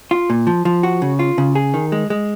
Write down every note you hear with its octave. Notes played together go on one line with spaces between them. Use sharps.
F4
A#2
F3
F3
F#4
C#3
F4
C#3
G#4
D#3
G#3
G#3